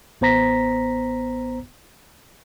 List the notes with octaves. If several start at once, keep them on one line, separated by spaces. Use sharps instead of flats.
A1 B3 C5 A#5 A#6 B6